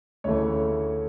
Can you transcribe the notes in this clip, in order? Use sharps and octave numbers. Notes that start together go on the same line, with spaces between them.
D2 C#3 E3 A3 C#5